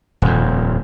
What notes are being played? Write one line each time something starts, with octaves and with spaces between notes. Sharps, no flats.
D#1 F2